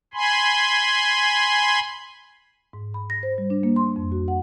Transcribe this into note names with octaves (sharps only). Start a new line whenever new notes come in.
G#5 B5 C6
G#2
B5
A#6
C5
G3
D4
A#3
C6
F2
F#4
F#5